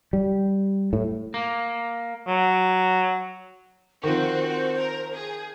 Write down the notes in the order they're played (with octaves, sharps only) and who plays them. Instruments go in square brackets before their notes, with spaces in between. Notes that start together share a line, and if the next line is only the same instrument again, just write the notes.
[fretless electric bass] G3
A2
[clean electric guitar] A#3
[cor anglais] F#3
[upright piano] D#3 F3 [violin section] C4 F#4 [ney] C5
[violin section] A#4
G#4